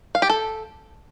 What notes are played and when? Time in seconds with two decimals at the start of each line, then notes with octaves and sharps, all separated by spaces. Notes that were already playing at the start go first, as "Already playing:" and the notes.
0.15 F5
0.22 G4
0.30 A4